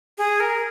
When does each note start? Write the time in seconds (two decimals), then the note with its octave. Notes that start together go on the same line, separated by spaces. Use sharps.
0.18 G#4
0.40 A#4